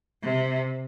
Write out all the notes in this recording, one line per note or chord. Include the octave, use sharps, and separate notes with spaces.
C3